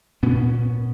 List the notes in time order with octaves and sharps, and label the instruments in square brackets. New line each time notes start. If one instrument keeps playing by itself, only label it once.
[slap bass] A#2 B3 C#4